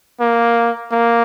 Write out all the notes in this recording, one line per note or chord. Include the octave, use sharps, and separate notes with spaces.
A#3
A#3